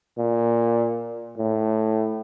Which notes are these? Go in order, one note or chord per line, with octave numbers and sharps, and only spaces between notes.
A#2
A2